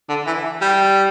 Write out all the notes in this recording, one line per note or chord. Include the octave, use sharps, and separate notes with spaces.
D3
E3
G3